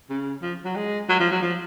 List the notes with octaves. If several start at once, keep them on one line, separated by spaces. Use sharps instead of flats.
C#3
F3
F#3
G#3
F#3
F3
F#3
F3